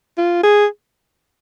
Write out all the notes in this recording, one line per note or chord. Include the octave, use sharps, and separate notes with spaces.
F4
G#4